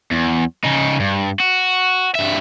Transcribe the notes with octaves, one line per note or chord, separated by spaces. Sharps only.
E2
C#3 D#4
G2
F#4
G2 E5